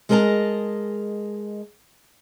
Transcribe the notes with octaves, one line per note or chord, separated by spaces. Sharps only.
G#3 G#4 A#4 D#5 A5 A#5